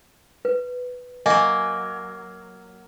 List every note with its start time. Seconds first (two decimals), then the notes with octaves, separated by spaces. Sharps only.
0.45 B4
1.26 F#3 A#3 D#5 G#5